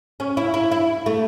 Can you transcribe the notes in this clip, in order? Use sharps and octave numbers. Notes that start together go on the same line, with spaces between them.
C#4
E4
E4
E4
A3